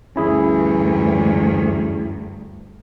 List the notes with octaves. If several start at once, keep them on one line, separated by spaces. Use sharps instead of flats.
D2 G2 E3 C#4 E4 G#4